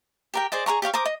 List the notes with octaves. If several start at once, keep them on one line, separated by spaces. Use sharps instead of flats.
G4 A#4 G5
G#4 C5 D5 D#5
G#4 C5 A#5 C#6
G4 C#5 F5 C#6
A#4 C5 D6 D#6
D#5